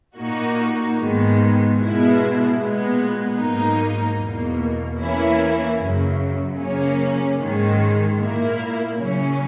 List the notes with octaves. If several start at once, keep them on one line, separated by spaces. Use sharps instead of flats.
A#2 A#3 D#4 F#4
G#2 D#3 G#3 B3
B2 G#3 B3 E4
A#2 G#3 B3
G#2 F#3 A#3 D#4
E2 B2 A#3
E3 A#3 C#4 E4
F#2 C#3 F#3
C#3 F#3 A#3 C#4
G#2 D#3 G#3
A#2 A#3 E4
C#3 F#3 C#4